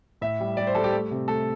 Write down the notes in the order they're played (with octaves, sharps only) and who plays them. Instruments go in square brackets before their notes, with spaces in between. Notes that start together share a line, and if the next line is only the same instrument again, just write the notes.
[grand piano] A2 E5
G3
G3 D5
C5
G3 A4
G4
A3
C3
A3 A4